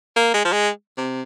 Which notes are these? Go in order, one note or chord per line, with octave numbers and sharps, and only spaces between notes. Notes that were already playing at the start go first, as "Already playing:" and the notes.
A#3
G#3
F3
G#3
C3